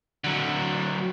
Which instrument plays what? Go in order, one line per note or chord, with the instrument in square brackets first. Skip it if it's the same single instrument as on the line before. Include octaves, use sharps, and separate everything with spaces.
[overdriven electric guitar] D3 F#3